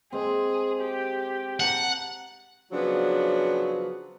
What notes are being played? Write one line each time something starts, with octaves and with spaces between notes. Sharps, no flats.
G#3 C4 G#4
G4
F#5 A5 A#5
C#3 F3 F#3 B3 D4